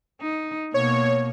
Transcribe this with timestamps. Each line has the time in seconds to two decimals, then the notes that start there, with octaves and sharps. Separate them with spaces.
0.21 D#4
0.74 B2 A#3 C#5